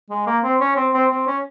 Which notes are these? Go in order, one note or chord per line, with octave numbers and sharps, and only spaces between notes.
G#3
A#3
C4
C#4
C4
C4
C4
C#4